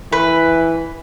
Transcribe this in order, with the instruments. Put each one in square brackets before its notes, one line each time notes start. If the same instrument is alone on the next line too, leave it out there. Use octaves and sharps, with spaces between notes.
[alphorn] E3 [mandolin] B4